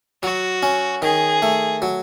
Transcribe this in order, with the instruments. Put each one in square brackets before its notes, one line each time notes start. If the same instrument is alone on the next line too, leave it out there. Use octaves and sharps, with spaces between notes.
[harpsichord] F#3 [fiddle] F#4
[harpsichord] C#4
[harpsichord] D#3 [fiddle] G#4
[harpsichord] A3
F#3